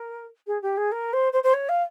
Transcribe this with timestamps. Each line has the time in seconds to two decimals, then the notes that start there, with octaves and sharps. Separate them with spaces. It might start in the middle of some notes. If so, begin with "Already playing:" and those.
Already playing: A#4
0.47 G#4
0.62 G4
0.77 G#4
0.91 A#4
1.13 C5
1.32 C5
1.43 C5
1.53 C#5
1.69 F5